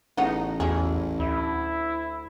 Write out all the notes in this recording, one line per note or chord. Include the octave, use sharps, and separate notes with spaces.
A1 C#3 B3 D#4 F#5
E2 F#3 C#4 G#4
D2 E4